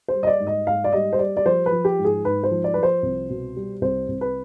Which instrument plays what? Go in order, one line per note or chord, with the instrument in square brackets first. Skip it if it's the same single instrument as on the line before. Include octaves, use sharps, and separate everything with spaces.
[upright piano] C5
G3
D#5
D5
G#2
D#5
G#2 F5
D5
G3 D#5
C5
G3 D5
D5
F3 C5
B4
F3
G4
G#2
G#4
G#2 B4
C5
F3
D5
F3 B4
C5
C2
B2
G3
C2 C5
C2
B4